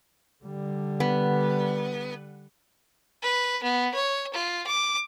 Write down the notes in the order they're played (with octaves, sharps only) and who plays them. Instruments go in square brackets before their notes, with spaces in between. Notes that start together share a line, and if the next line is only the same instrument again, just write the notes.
[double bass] D3 G3
[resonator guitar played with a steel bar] B3
[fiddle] B4
B3
C#5
F4
D6